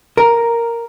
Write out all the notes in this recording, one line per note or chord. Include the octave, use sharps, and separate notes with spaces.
A#4